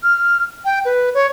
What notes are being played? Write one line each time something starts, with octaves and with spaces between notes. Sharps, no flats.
F6
G5
B4
C#5